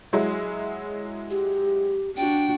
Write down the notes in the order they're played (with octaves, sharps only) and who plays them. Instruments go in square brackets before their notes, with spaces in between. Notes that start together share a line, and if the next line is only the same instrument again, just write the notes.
[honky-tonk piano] F#3 G#3 E4
[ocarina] G4
[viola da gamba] D4 F#4 [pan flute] G5